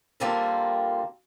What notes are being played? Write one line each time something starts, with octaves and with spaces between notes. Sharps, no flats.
D3 G3 A#3 C4 F4 A#4